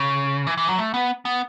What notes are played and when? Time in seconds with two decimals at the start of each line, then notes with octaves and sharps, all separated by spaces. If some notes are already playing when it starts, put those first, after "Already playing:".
Already playing: C#3
0.47 E3
0.57 E3
0.68 F#3
0.78 A3
0.94 B3
1.25 B3